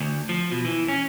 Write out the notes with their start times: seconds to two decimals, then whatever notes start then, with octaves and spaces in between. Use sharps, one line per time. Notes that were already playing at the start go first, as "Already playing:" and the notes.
0.01 D2
0.29 F3
0.52 B2
0.65 E3
0.88 C#4